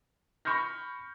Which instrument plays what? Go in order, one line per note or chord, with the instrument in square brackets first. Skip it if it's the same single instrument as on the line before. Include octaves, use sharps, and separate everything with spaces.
[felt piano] B5 C#6 F6 G6 A#6